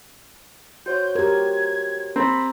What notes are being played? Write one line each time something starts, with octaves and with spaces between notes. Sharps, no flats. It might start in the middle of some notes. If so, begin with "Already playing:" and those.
F#4 C5 C#5 G6
G4 A#4 G#6
C4 A#5 B5 A6